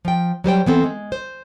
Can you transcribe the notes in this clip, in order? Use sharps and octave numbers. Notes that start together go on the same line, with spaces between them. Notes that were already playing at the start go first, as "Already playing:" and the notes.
F3 G5
F#3 G3 C5 G5
E3 B3 C4 A4
G#3
C5